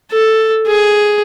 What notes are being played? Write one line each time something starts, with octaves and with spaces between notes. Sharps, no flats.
A4
G#4